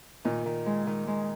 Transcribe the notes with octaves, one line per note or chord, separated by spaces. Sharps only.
A#2 D#3
D#3
G#3
D#3
G#3